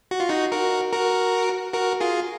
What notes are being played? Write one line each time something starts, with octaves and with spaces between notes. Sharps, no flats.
F#4
F4
D#4 F#4
F#4 A#4
F#4 A#4
F#4 A#4
F4 G#4